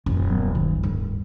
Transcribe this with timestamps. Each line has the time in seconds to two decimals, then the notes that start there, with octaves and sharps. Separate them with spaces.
0.06 D#1 F#2 E3 C#4
0.30 F#3 B3
0.55 B1 G2 D#3 F3
0.83 D1 G2